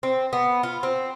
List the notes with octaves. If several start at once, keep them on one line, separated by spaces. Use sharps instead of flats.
C4
B3
F4
C4